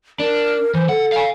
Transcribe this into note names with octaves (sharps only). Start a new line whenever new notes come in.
D4 A#4
E3 C5
A4 F#5
F5 G#5